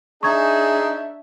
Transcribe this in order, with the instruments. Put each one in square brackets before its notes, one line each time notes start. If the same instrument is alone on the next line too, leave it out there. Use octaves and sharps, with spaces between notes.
[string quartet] D4 E5 [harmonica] D#4 [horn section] G#4 [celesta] C#6 G#6